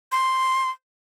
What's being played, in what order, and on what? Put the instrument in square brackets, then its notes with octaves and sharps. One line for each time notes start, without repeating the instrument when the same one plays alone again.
[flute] C6